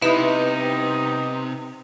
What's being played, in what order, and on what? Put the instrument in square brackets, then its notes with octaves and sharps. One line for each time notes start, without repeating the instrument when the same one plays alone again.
[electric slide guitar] C3 [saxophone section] G3 B3 D#4 [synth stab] E4 [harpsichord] B4 D#5